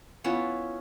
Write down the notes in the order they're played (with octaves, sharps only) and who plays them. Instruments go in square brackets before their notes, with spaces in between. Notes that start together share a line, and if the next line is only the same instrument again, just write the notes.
[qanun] B3 C#4 E4 F4